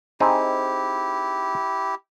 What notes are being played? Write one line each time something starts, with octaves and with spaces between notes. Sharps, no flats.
C4 D#4 E4 G4 G#4